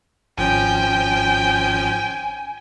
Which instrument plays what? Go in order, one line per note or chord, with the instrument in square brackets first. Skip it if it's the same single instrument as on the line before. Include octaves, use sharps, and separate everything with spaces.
[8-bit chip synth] G#1 F3 C#4 [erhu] G5 [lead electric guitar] G#5